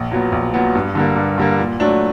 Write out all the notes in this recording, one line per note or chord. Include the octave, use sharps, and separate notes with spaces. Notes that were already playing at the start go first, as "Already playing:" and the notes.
Already playing: A#1
A#2 F#3 B3
A#1
A#2 F#3 B3
G2
D3 G3 A#3
G2
D3 G3 A#3
A#2
F#3 A3 D4